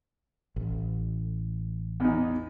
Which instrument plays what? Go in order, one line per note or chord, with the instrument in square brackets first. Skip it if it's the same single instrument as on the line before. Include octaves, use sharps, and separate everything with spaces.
[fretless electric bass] A1
[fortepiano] E2 D#4